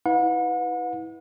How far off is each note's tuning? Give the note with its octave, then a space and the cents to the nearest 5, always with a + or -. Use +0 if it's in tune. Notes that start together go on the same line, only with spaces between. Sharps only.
E4 -35 B4 +0 F#5 -40